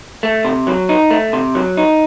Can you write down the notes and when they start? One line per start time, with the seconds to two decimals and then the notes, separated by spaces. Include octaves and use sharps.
0.23 A3
0.45 C3
0.67 F#3
0.89 D#4
1.11 A3
1.33 C3
1.55 F#3
1.77 D#4